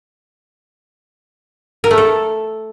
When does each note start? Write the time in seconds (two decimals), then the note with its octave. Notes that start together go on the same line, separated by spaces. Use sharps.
1.84 A#4
1.91 A3
1.98 A4